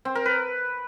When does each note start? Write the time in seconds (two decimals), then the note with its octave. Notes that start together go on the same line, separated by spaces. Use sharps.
0.05 C4
0.15 A#4
0.26 B4